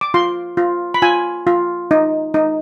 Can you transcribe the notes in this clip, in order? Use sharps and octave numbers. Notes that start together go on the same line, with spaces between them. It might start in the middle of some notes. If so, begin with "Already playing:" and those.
D6
F4 C6
F4
B5
F4 G#5
F4
D#4
D#4